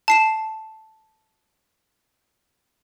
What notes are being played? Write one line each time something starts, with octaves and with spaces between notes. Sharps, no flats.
A5 C7 E7